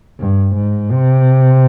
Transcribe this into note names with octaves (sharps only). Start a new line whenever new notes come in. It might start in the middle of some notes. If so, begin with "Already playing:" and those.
G2
G#2
C3